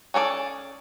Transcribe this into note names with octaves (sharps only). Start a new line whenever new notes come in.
C#4 G#4 A4 D5